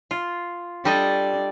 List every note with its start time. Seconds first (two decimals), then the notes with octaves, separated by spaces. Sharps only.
0.11 F4
0.85 G3 D4 A4 D#5